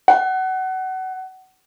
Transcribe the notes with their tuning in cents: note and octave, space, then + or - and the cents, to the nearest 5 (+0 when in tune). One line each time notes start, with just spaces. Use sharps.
F#5 +25